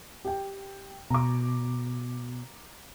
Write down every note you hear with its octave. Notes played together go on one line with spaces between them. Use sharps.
G4 G5
B2 A#5 D6